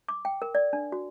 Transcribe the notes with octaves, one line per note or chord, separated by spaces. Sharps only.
D6
G5
A#4
D5
D4
F#4